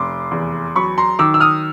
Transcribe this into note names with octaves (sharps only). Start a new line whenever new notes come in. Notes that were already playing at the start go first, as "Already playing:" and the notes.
Already playing: F1 C6 D6
E2
F#3 B5 C#6
A#5 C6
D#3 D6 E6
E6
D#6 F6